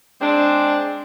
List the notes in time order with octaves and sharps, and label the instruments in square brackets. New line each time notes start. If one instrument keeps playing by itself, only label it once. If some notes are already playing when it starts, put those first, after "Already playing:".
[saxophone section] G#3 C4 D4